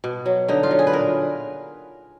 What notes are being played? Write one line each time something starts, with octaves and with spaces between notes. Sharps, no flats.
B2
F#3
D3 D#4
F4
F#3
G#4
B4
A#2 A#4